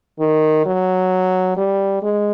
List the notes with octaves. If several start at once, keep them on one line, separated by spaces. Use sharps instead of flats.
D#3
F#3
G3
G#3